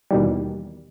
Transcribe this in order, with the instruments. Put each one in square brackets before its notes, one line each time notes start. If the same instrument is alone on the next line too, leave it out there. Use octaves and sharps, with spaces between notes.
[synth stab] D#2 B2 D#3 E3 G3